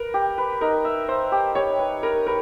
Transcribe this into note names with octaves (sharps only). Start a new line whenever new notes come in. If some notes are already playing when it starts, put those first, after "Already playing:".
Already playing: A#4 B4
G4
B4
D#4 A#4
E5
C5 E5
G4
G4 C#5
B4
A#4 B4
A#4 B4